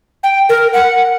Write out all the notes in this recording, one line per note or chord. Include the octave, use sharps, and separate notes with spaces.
G5
A#4
F#5